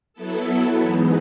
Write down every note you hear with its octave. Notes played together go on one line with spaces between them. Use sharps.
F#3 B3 E4 A4
G#2 E3 G#3 B3 D#4